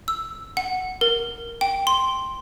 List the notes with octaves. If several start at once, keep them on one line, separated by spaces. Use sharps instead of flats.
E6
F#5
A#4
G5
C6